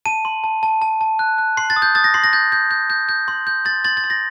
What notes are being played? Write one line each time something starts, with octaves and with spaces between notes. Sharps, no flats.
A5 D#7
C6
A5
A5
A5
A5
F#6
F#6
C6 C7
A6
D#6
G6
D#6 A6
A#6
C6 C7
A#6
G6 A6
G6
G6
G6
G6
C6
G6
C6 A6
C6 A6
A6
C6
A#6